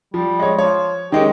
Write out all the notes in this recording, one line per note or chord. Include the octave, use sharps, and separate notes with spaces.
F3 G3
G#3 C#5
F3 C#5
D#3 G#3 C#4 G4